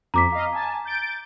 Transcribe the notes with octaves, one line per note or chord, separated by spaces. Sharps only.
F2 A#5 D6 B6
D#5 F5
G#5 A5
G6 A6 D7